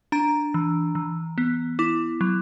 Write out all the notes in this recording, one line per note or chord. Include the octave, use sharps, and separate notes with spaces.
D4 A#5
E3
E3
B3
E4 D6
F#3